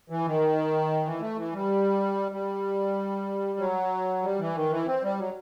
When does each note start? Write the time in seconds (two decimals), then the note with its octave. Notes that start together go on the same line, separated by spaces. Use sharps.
0.10 E3
0.25 D#3
1.05 E3
1.20 A3
1.37 E3
1.53 G3
2.32 G3
3.59 F#3
4.23 G3
4.39 E3
4.55 D#3
4.70 E3
4.86 C4
5.03 G3
5.19 F#3